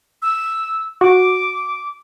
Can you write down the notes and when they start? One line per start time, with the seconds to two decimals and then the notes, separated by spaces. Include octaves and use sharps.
0.22 E6
1.01 F#4 D6